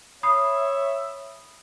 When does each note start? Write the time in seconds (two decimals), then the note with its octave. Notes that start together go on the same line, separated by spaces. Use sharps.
0.23 C#5 E5 B5 D#6 C7